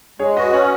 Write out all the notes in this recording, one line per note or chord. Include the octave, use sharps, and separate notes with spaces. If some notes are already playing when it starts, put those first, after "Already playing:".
G#3 G#4 C#5
F#4 B4 D#5
C#4 C#5 F#5